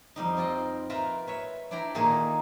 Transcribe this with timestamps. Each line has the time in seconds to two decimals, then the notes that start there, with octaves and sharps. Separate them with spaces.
0.16 F2 G3 D#4
0.37 C4 F4 D5 D#5
0.90 F4 A#4 B4 E5 G5 A#5
1.27 B4 C#5 E5
1.71 D4 E4 D5 G5 A#5
1.95 A#2 D#3 A#3 D#4 G#4 A4